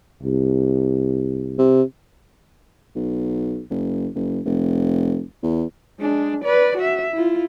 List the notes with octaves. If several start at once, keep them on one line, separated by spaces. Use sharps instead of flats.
C2
C3
B1
F#1
F#1
F1
E2
G#3 D4
B4 D5
F#4 E5
E4 F4